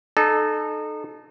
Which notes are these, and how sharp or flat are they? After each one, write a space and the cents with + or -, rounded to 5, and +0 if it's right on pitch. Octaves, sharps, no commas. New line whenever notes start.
D#4 -30 A4 -20